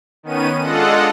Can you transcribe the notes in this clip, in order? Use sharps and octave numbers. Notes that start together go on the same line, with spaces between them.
D#3 B3 C#4 D#7
G#3 D4 F4 A4 D#5 F#5